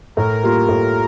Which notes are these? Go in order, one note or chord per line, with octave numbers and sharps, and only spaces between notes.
A2 A#4
G3 A#3 F4
A2